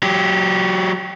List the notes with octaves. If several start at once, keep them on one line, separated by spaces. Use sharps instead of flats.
F#3 G4